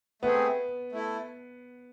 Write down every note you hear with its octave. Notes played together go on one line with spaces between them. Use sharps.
A3 B3 C4 G#4
A3 E4 A4